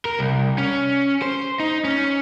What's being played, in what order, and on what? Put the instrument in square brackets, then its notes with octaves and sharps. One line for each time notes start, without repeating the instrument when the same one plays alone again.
[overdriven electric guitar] A#4
C2
C#4
C5
D#4
C#4